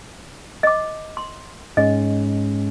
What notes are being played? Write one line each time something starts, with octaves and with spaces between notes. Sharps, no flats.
D#5 D6
C6
G#2 G#3 C#4 D#5